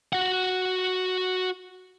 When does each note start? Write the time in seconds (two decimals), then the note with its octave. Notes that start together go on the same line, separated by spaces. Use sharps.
0.13 F#4 F#5